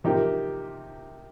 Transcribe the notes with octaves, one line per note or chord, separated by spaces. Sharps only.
C3 F3 A#3 D#4 G4